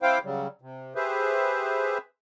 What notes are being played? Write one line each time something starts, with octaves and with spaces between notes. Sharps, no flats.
C4 E4 C5 F5 G5 D6
C#3 F#3 G3
C3
G4 G#4 B4 C5 E5